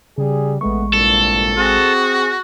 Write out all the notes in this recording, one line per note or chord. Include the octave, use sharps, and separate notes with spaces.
C#3 G3 G#4
A1 G#3 A3 B3 C#6
C2 G2 A#2 A4
C4 F#4 G#4